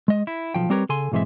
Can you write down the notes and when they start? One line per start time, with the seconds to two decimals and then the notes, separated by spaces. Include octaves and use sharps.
0.08 G#3 D#5
0.27 E4
0.54 B1 F3 G5
0.70 G3 C4 G4 A#4 B4 C#5
0.89 C#3 A4 G#5 C6
1.12 B1 G#2 E3 G#3 C4 E5